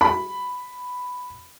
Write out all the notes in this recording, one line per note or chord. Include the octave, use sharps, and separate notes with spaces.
B5